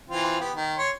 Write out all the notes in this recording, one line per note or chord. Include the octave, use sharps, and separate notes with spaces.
E3 C4 F4
B3 G4
D#3
C#5 C6